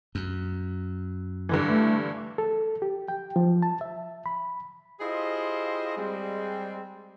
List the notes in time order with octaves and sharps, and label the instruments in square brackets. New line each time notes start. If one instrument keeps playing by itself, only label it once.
[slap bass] F#2
[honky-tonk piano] G2 D3 E3
[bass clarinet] A3
[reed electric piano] A4
G4
G5
F3
A5
E5
B5
[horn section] E4 F4 G4 G#4 C5 D#5
G3 G#3 C4